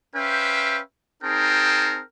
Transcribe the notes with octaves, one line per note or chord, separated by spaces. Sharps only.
C#4 B4 C5 E5 F5 G5
C4 D#4 G#4 A#4 G5 A5